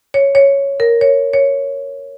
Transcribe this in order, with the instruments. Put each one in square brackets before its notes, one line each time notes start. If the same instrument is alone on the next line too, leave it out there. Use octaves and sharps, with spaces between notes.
[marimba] C#5
C#5
A#4
C#5
C#5